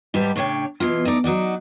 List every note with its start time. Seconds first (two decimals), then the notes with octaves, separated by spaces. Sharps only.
0.14 G#2 G3 G4 B4 A5
0.36 A2 C#3 D4 C#5 G5
0.80 B2 E3 F4
1.05 A3 D#4 D5
1.24 F#3 D#4 F#4 D5